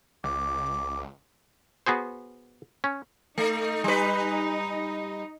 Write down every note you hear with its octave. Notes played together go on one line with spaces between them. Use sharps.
C#2 D6
B3 F#4 G#4 C5
C#4
A3 D#4
G3 B4